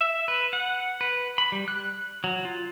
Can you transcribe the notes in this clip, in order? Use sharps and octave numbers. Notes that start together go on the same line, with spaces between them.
E5
B4
F#5
B4
B5
G3
F#6
F#3
F4